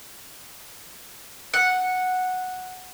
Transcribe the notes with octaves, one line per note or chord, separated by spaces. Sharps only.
F#5